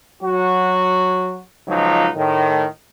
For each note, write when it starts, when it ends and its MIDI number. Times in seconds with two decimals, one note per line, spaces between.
0.22 1.37 54
0.22 1.37 66
1.67 2.08 37
1.67 2.08 53
1.67 2.08 54
1.67 2.08 63
2.15 2.64 45
2.15 2.64 51